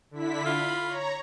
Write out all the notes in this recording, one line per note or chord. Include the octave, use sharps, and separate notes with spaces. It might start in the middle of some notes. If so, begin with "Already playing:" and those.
D3 E4 B6
F4 B5
C#5 A#5